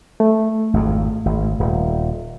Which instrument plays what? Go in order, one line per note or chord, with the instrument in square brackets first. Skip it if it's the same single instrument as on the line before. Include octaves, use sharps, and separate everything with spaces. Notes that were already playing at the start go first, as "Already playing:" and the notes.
[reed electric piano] A3
[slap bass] G#1 F2
G#1
D#1